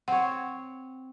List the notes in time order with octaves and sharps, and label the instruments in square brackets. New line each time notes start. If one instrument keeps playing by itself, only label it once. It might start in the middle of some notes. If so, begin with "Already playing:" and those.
[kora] C4 C#5 [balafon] F#5